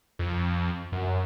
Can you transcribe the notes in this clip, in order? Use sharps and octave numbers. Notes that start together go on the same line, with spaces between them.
F2
F#2